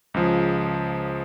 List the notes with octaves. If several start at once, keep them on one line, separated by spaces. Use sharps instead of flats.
C#2 C#3 F3